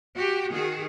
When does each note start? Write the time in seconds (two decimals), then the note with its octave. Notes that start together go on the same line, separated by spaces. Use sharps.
0.15 F#4 G4
0.52 D#3 F#4 G#4